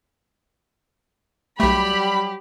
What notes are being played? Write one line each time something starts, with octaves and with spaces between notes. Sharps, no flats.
B1 F#3 G3 A3 G4 B5